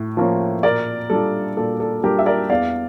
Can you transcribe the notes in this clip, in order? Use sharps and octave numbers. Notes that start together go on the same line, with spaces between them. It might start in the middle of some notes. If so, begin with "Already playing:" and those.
Already playing: A2
F3 A#3 C#4
A#2 A#4 D5
G3 D4 F4 A4
A#2 A4
A4
G3 D4 F4 G4 A#4
E5
A#4 D5
E2 D5 F5